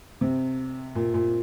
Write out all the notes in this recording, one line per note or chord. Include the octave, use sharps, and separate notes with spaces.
C3
A#2
A#2